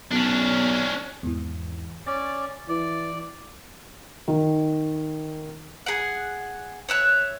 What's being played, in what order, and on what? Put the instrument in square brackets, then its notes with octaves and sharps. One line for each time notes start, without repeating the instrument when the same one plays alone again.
[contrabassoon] B1 [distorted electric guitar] C#4 D4
[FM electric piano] E2 G#2 E3
[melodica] C#4 D5 [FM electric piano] A6
[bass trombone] E3 [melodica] D5
[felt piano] D#3
[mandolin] G#4 F#5
C#5 E5 F#6